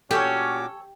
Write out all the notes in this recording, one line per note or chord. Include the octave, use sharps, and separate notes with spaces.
A#2 C#4 F#4 G4 A4 C#5 G#5 D6